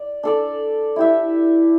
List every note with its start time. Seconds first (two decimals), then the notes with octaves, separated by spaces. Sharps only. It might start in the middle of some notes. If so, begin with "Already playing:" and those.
Already playing: D5
0.23 D4 A4 D5
0.96 E4 G4 E5